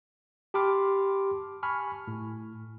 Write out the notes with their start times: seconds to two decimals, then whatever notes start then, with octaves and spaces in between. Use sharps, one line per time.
0.54 G4 A5 B5 C6 D6 F6
1.63 G#5 A5 B5 C#6 F6
2.07 A2